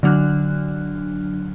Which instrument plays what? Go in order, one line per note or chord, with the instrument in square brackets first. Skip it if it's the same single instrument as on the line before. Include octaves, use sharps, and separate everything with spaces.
[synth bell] D3 F#3 D4 F6 F#6